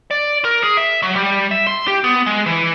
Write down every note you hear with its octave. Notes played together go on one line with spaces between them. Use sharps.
D5
A#4
G#4
E5
F#3
G3
E5
C6
G4
B3
G#3
E3